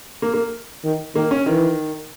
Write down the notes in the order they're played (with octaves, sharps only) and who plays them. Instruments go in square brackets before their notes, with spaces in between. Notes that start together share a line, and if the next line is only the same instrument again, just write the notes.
[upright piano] A#3
A#3
[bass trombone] D#3
[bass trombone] D#3 [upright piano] A#3
[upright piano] C#4
[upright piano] D#3 [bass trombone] E3